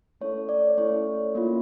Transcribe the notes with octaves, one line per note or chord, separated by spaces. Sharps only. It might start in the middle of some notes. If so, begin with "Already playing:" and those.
A3 C#4 E4 A4 C#5
D5
A3 C#4 E4 A4 C#5
A#3 C#4 F4